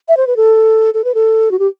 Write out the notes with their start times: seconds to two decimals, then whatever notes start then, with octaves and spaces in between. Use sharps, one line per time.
0.08 E5
0.17 C5
0.27 B4
0.36 A4
0.94 A4
1.04 B4
1.14 A4
1.51 F#4
1.59 G4